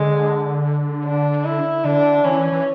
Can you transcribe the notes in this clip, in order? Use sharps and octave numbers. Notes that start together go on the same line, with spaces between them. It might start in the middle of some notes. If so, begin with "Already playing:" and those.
Already playing: D3 G#3
D4
E4
D3 D4
E3 C#4
E3